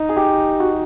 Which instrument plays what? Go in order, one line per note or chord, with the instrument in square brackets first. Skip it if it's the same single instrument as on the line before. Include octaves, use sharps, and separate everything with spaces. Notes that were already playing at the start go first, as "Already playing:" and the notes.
Already playing: [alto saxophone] D#4
[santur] G#4
G4
F#4